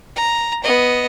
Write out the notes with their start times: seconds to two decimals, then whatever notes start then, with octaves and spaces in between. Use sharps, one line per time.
0.16 A#5
0.64 B3 D#5